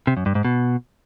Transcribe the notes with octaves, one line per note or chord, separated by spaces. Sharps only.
C3
F#2
G2
G#2
B2